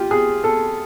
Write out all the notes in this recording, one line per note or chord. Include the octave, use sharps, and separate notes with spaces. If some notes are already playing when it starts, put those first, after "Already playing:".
Already playing: F4 G4
G#4
A4